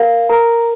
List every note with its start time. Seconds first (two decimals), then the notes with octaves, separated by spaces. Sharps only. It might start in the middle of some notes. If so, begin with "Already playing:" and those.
Already playing: A#4 F5
0.29 A#4 A#5